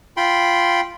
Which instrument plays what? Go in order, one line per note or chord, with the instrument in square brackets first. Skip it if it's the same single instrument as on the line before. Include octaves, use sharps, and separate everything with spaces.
[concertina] F4 G5 B5 C6